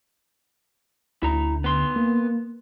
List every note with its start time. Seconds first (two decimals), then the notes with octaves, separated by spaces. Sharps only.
1.23 D2 E4 A#5
1.64 B3 C6
1.96 A#3